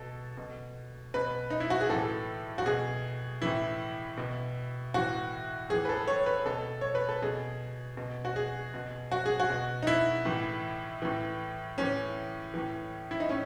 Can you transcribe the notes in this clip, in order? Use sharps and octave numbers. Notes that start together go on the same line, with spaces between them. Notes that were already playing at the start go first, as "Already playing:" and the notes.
Already playing: B2 A4
B2
B2 B4
D#4
E4
F#4
G#4
A2 E3 A4
F#4
B2 G#4
A2 E3 E4
B2
A2 E3 F#4
A2 E3 G#4
B4
A4
C#5
B4
B2 A4
C#5
B4
A4
B2 G#4
B2
F#4
G#4
B2
F#4
G#4
F#4
B2
D#4
E4
A2 E3
A2 E3
A2 E3 C#4
A2 E3
E4
D#4
A2 C#4